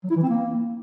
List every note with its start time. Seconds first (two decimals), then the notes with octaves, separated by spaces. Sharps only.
0.04 F#3
0.10 E4
0.16 E3
0.23 C4
0.29 A#3